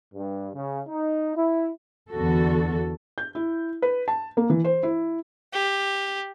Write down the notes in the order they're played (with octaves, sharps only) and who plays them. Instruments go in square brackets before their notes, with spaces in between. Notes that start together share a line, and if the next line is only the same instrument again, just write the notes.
[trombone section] G2
C#3
D#4
E4
[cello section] E2 D3 F#4 A4
[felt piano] G6
E4
B4
A5
A#3
E3
C5
E4
[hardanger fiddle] G4